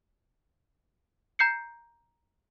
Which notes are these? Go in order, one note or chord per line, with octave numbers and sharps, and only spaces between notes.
A#5 G6 C7 C#7